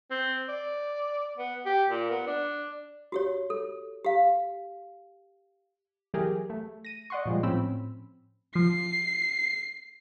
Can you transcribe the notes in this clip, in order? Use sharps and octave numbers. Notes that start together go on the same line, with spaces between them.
C4
D5
B3
G4
A#2
B3
D4
F#4 G4 C#5
A4
G4 F5
E3 F#3 G4 G#4 A#4
A3
A#6 D#7
D5 D#5 F#5 C6 C#6
A#2 F3 G3 G#3
A2 F3 C4 C#4 B5 E6
F3 C7